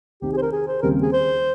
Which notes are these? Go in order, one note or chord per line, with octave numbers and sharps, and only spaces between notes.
C2 C3 D#3 G4
G#4
C5
A#4
G#4
C5
D#2 C#3 G3 C4 G4 A#4
G#4
C5